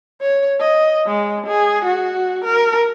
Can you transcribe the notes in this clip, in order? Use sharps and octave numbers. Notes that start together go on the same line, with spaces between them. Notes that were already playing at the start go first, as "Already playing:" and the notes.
C#5
D#5
G#3
G#4
F#4
A#4